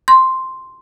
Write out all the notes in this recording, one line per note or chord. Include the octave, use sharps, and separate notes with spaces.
C6